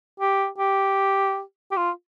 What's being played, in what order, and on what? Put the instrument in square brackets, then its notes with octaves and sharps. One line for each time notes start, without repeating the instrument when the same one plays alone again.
[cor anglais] G4
G4
G4
F4